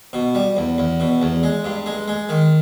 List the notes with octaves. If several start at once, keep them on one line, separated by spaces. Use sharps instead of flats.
B2
G3
E2
E2
B2
E2
G#3
G2
G#3
G#3
D#3